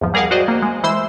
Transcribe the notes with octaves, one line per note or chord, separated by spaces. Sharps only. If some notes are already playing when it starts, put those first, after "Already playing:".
E2 G#2 F3
G3 G#4 A#4 F5 F#5
F#4 C5 D5 D#5
A#3
G#3
E3 C5 C6 E6